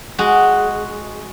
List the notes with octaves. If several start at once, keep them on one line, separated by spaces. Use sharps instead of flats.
G#3 F#4